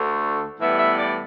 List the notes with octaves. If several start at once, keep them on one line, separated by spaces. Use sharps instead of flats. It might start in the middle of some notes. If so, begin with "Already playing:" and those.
Already playing: D2 D3 A3
A2 E3 G3 B3 E5
E5
D5